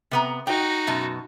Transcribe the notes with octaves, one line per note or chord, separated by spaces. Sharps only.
C3 B3 A#5
D#4 F#4 G5
F#2 B2 A5